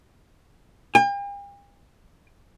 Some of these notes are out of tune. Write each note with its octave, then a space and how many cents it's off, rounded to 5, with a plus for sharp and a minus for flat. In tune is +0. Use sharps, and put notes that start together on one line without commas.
G5 +45